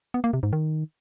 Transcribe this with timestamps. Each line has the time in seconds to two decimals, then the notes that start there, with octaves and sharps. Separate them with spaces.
0.14 B3
0.24 A#3
0.33 C3
0.43 G#2
0.53 D#3